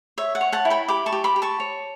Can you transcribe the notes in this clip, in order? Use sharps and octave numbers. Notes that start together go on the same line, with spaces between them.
C#5 E5
F#5
C#5
F#5 A5
E4
G5 B5
G4 B5 D6
A5 C#6
G4
B5 D6
G4
A5 C#6
C#5